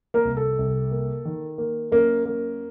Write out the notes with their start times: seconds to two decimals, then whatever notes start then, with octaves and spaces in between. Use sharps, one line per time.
0.14 A#3 A#4
0.25 C2
0.37 A4
0.59 C2
0.91 A#3
1.25 D#3
1.58 A#3
1.91 F#2 A#3 A#4
2.26 A#3